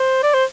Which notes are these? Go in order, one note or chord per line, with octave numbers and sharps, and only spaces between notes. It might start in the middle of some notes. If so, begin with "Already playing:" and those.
Already playing: C5
D5
C5